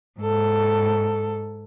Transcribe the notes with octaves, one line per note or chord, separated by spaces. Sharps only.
G#2 A4